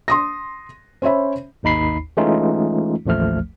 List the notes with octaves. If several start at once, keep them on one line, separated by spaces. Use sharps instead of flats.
C6 D#6 A#6
C#4 C5 C#5 E5 B5
G#1 D#2 D#4 B5 C7
E3 G#3 A3 C#4 D#4 F4
A1 D#2 F3 A3 F6